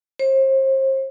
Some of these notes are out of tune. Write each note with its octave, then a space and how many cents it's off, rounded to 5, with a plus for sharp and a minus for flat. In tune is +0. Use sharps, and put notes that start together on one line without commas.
C5 +35